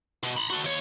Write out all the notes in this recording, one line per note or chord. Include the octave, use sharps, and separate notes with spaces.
B2
A#5 B5
F#4 A4
D#2 C#5